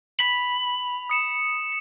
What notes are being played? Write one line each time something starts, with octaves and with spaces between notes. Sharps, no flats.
B5 F7
D#6 C#7 E7